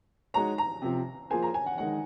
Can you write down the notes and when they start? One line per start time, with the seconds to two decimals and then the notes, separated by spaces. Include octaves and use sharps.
0.34 G#3 D#4 F#4 C#5 A#5
0.58 A#5
0.82 C3 F3 C4
1.30 F3 A#3 F4 G#4 C5 G#5
1.42 A#5
1.54 G#5
1.66 F#5
1.78 D#3 G#3 D#4 F#5